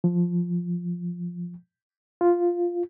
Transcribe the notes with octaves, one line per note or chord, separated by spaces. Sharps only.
F3
F4